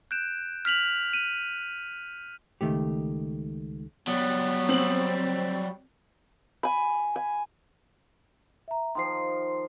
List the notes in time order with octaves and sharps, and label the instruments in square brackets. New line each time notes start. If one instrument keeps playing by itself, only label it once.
[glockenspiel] F#6 G6 D7 E7
F6 B6 F7 F#7
D#7
[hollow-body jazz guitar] C#2 F#2 D#3 A3 G4
[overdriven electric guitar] F#3 G3 [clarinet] B3
[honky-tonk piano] C4 F#7
[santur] G#5 B5
G#5
[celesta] E5 A#5
[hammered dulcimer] D#3 F3 [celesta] C6 C7